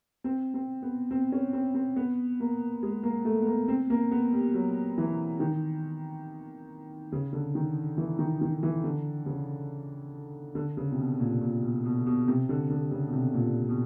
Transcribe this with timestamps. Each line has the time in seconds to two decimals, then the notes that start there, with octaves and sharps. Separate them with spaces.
0.24 C4
0.54 C4
0.82 B3
1.11 C4
1.32 C#4
1.53 C4
1.74 C4
1.96 B3
2.40 A#3
2.83 G#3
3.03 A#3
3.25 A3
3.42 B3
3.46 A#3
3.68 C4
3.90 A#3
4.11 B3
4.33 G3
4.54 F#3
4.98 E3
5.40 D#3
7.12 C#3
7.33 D3
7.55 D#3
7.97 E3
8.19 D#3
8.41 D#3
8.63 E3
8.84 D3
9.26 C#3
10.55 D3
10.77 C#3
10.92 C3
10.98 B2
11.20 A#2
11.41 A#2
11.62 B2
11.85 B2
12.06 B2
12.28 C3
12.49 D3
12.70 D3
12.91 C#3
13.08 B2
13.13 C3
13.34 A#2
13.69 B2